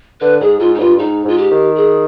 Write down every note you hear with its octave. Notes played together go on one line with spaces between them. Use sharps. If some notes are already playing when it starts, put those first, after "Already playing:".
D3 B4
G#2 G#4
G#2 F4
D#4
G2 F4
G#2 D#4
G#2 F4
G4
D#3
G#4